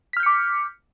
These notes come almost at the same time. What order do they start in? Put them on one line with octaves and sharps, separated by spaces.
B6 F6 G6 C#7 D6